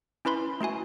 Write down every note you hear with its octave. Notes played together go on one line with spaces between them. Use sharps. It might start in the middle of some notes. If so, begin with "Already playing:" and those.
C#4 E4 B4 B5 C6
A3 E4 F#4 G#5